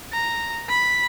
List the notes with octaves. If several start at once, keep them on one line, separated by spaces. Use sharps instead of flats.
A#5
B5